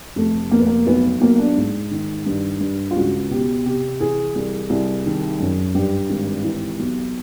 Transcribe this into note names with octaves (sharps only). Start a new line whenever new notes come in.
F1 A3
F1 A#3
B3
A#3
B1 B3
B1 A#3
D4
G#2
D#3
G2
G2
F4
C#2 F#4
B2 G4
C3 G4
E3 G#4
C2
C2
D#3
F#2
G2 G4
G#1
E3
B1